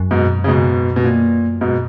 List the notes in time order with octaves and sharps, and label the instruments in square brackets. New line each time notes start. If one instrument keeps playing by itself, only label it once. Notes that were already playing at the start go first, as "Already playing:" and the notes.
Already playing: [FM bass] F#2
[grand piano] G#2 B2
C#3
G#2 B2
B2
A#2
G#2 B2